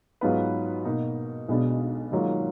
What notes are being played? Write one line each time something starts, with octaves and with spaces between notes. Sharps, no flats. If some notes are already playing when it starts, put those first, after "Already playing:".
G#2 F#3 B3 F4 B4
B2 A#3 D#4
B1 B2 G#3 B3 D4
G#1 G#2 F#3 A#3 F4